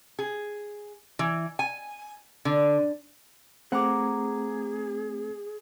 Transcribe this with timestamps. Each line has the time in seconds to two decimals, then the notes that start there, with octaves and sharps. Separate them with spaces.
0.19 G#4
1.19 E3
1.59 G#5
2.45 D3
3.72 A3 C4 G#4 F#5 A#5 D6